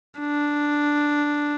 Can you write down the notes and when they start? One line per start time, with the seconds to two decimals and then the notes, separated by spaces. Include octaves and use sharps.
0.19 D4